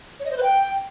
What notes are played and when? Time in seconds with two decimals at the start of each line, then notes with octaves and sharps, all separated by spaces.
0.19 C#5
0.25 D#5
0.31 C5
0.37 B4
0.43 G5